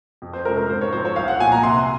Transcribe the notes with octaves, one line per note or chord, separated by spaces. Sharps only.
F2
C5
C3 F3 G#3 C#4 A#4
A#4
G#2 C5
C#5
F3 C4 C5
C#5
C2 F5
F#5
A#2 F3 G#5
A#5
C3 C6